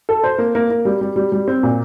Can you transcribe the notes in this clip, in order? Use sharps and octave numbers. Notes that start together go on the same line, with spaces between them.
A4
C5
A#3
A#3
A#3
G3
G3
G3
G3
C4
A#2